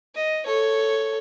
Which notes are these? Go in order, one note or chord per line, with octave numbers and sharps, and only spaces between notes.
D#5
A4 C#5